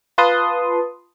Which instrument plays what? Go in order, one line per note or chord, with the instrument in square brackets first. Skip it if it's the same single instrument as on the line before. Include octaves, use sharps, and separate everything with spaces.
[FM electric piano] F4 B4 A5 C6 D#6